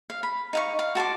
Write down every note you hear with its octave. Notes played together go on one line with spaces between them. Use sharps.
F5
B5
D#4 F5 C#6
F5
F#4 A5 C6 D6